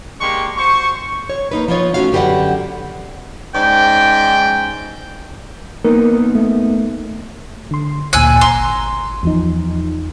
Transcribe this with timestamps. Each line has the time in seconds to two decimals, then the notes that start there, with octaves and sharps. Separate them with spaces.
0.21 G#3 A#3 D4 G4 C6 C#6
0.56 F#4 C5 C6 C#6
1.30 C#5
1.51 A#3 D#4 B4
1.68 F3 B3 D#4 F4 C#5
1.94 A3 C#4 F4 F#4 C#5 F5
2.12 F#2 D3 G4 B4 D5 F#5
3.55 G#2 C#4 D5 G5
5.85 A#3 B3 D#4 A#4
6.35 A3
7.71 D3 C6
8.13 A1 D2 A#2 G#5 E6 F#6
8.41 G#1 A#5 C6
9.23 E2 F3 D#4